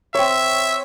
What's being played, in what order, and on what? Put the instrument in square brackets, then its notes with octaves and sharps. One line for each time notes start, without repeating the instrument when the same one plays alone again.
[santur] C4 C#5 [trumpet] E5